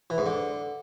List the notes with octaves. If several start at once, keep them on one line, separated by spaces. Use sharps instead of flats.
E3
G#2
D3